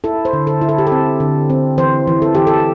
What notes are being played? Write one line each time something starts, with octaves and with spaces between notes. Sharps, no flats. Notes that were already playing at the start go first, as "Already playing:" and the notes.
E4 A4
C5
D3
A4
E4
A4
G4
A4
C4
D3
C4
E3 C5
E3
A4
E3 G4
A4